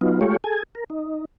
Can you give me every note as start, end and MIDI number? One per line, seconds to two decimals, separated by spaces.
0.01 0.20 54
0.01 0.20 59
0.01 0.20 63
0.01 0.20 65
0.21 0.37 56
0.21 0.37 57
0.21 0.37 65
0.21 0.37 67
0.21 0.37 73
0.44 0.63 68
0.44 0.63 69
0.44 0.63 80
0.75 0.84 70
0.90 1.25 63